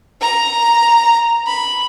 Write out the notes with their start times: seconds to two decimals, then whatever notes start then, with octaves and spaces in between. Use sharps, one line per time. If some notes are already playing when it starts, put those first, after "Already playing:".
0.21 A#5
1.47 B5